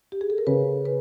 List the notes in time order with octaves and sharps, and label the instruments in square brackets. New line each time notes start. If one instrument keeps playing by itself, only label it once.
[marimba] G4
G#4
A4
A#4
[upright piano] C#3 [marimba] B4
[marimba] B4